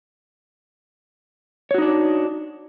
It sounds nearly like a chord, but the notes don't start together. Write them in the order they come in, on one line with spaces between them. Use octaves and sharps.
C#5 F#4 D#4 D4